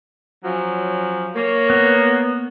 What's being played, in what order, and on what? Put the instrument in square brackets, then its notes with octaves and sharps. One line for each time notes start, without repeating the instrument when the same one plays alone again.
[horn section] F3 F#3 C#4
[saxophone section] A#3 [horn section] C#5
[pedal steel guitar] B3